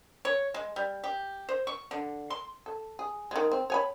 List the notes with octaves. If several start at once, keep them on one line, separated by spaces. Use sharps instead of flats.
C#5
G#3
G3
G4
C5
C#6
D3
C6
A4
G#4
D#3 G#3
C4
C#5 G#5 B5